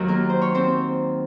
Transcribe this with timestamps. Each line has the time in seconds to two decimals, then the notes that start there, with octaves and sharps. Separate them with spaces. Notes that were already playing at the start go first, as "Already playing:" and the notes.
Already playing: D#2 D#3 F#3 F#4
0.08 A#3 A#4
0.29 C5
0.42 C#5
0.55 C4 C5